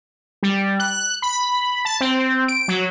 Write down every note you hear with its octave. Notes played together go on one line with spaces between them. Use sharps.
G3
F#6
B5
A5
C4
D7
F#3